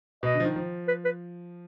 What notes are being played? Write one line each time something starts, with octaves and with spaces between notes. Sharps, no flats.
B2 D#5
D3
F3
D#3
F3
B4
B4